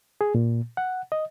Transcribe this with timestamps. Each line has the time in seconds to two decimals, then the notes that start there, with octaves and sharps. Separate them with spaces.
0.21 G#4
0.35 A#2
0.77 F#5
1.12 D#5